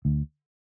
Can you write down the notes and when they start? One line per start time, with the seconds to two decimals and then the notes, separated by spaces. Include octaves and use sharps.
0.05 D2